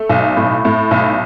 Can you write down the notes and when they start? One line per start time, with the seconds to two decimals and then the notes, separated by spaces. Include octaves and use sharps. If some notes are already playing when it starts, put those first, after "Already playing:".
Already playing: A3
0.09 B1
0.37 A2
0.65 A2
0.91 B1